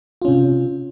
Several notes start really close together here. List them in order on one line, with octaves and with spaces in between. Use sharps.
F4 C#4 C3